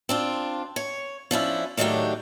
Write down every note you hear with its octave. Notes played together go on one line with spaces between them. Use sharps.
C4 D4 F4
C#5
F3 C#4 D4 E4
A2 D#3 F#3 A3 D4 G4